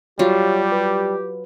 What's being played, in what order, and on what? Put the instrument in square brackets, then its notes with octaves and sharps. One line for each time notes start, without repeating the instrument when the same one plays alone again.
[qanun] F#3 F4 [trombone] G3 [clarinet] G4 [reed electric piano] C#5
[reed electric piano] B4